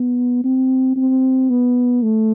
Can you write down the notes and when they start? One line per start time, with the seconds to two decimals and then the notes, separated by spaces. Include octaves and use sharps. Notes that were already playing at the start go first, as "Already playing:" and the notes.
Already playing: B3
0.44 C4
0.96 C4
1.50 B3
2.03 A3